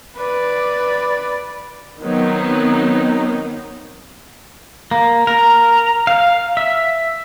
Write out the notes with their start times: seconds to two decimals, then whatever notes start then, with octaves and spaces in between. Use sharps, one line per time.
0.18 B4 D5
2.02 D#3 F#3 B3 C4 D#4
4.91 A#3
5.27 A#4
6.07 F5
6.57 E5